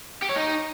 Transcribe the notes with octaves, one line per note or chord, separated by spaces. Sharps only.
G4
C#5
D#4